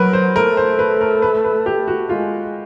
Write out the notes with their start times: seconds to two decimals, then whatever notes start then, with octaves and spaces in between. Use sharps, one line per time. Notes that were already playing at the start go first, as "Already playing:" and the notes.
Already playing: F#3 A#4 B4
0.13 C5
0.36 A3 A#4
0.57 C5
0.79 B4
1.01 A#4
1.22 B4
1.44 B4
1.66 G4
1.88 F#4
2.09 G#3 F4